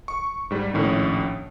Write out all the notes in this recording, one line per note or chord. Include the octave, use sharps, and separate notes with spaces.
C#6
G#2 G3
A#1 A2 D#3 C#4